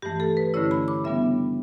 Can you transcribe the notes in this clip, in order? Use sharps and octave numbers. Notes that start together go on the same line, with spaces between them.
G2 E3 A3 G4
A4
B4
G2 D3 A3 C#4 E4 C#5
B5
D6
C#3 G3 B3 D4 E5